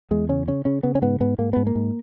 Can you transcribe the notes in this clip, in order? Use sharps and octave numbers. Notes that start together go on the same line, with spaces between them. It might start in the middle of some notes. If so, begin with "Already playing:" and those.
E2 G#3
C#3 C#4
C#3 C#4
C#3 C#4
C#3 B3
C#4
G#2 B3
G#2 B3
G#2 A#3
G#2 B3
A#3
G#2